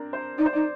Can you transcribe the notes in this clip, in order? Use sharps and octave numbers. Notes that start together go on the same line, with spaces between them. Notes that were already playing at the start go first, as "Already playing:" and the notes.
Already playing: C4 D4 A#4
C5
D#4 D5
C5
D#4 D5